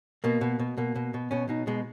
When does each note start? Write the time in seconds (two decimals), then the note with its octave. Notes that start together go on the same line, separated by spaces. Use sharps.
0.24 B2 A#3
0.41 B2
0.59 B2
0.77 B2 A#3
0.96 B2
1.14 B2
1.31 B2 C#4
1.49 B2 D#4
1.67 B2 G#3